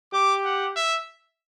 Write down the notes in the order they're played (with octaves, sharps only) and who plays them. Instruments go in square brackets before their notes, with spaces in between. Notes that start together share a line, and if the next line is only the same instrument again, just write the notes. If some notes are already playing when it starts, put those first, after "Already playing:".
[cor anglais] G4 [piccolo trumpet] D6
[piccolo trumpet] F#5
E5